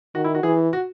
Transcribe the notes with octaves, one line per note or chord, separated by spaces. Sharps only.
D#3 F#4
E4
F#4
E3 G#4
F#4